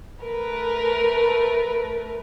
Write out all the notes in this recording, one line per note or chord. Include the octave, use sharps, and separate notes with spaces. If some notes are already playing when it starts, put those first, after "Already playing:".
A3 A#4 B4